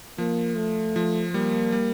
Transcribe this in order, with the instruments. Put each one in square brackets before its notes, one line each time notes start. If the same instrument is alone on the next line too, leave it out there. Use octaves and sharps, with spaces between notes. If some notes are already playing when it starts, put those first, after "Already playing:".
[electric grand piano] F3 [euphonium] A#3
[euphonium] A3
[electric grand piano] F3
[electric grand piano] G3 [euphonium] A#3
[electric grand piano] G3